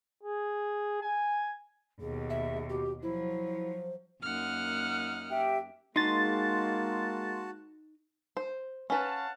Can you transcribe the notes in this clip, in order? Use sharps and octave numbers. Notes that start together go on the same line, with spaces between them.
G#4
G#5
D#2 B2 G#4
E5
F#4 G4
F3 F#3 E4 C5
F#2 A#3 D#4 F#5 F6
G4 E5 G5
G#3 A#3 D#4 F#4 A5 C6 A6
C5
C#4 B4 F5 F#5 A5